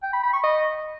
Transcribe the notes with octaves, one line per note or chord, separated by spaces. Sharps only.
G5
B5
B5
C#6
D#5